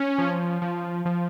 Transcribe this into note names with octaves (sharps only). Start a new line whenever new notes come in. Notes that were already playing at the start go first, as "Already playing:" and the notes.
Already playing: C#4
F3
F3
F3